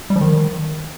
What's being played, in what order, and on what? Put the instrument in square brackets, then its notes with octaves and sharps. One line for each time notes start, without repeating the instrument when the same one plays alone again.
[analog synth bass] G3
F3
D#3